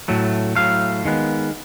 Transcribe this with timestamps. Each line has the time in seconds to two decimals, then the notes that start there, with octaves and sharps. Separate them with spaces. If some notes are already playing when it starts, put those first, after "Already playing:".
0.08 A2 F#3 A3
0.56 A2 F#3 A3 F5
1.05 D#3 G#3 B3